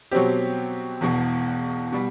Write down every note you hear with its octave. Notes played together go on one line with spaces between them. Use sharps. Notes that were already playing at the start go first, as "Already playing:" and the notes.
B2 F#3 C4 G4
E1 E2 B2
B2 G3